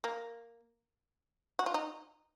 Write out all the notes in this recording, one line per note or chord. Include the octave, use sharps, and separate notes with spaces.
A#3
F#4
F4
D#4